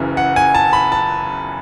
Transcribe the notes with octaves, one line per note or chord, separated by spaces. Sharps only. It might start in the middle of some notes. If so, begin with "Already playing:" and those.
Already playing: F#1 F#2 C#3 E3
F#5
G#5
A5
B5
A5